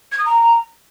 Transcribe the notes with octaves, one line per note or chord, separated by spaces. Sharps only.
G#6
D#6
A#5